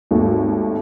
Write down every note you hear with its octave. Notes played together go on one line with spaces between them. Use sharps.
G#1 D#2 A3